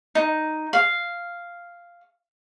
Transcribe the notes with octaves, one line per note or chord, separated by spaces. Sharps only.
D#4
F5